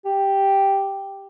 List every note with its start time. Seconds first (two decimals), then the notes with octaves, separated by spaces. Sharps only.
0.05 G4